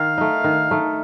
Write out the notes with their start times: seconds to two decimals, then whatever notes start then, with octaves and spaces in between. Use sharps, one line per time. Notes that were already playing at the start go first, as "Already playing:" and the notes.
Already playing: D#3 F5
0.18 A3 D#4
0.44 D#3
0.71 A3 D#4